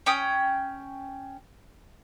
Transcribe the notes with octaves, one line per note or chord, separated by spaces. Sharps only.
C#4 G5 D#6